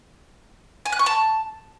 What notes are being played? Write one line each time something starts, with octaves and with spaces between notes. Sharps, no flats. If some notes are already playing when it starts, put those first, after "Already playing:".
G#5
F#6
C#6
A5